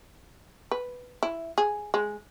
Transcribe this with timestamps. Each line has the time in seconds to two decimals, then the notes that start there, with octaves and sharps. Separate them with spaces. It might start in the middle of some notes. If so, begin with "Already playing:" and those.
0.71 B4
1.23 E4
1.58 G#4
1.94 G#3